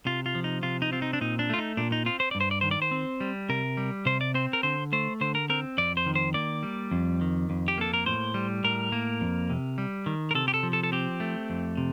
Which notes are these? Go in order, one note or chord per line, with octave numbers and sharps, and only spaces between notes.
C3 F4
F4
F3
D#4
C3 F4
D#4
C4 F4
D#4
D4
A#2 D#4
D4
A3 F4
D#4
A#2 D4
D#4
C4 F4
C5
G2 D5
C5
D5
D#3 C5
D5
C5
C4
G3
C3 A#4
G3
C3 C5
D5
C4 C5
A#4
D3 C5
A3 C5
D3 C5
A#4
C4 A#4
F2 D5
C5
D#3
C5
A#3 D5
G3
F2
D#3
F2
G4
A#3 A4
A#4
A2 C5
G3
A2 A#4
A#3
F2
C3
G3
D#3
A#4
C3 A4
G4
A4
F3
A4
A4
C4 G4
A3
F2
C3